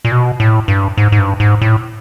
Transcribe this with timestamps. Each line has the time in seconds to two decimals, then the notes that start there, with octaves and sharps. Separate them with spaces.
0.05 A#2
0.12 B2
0.40 A2
0.68 G2
0.97 G#2
1.12 G#2
1.19 G2
1.40 G#2
1.61 A2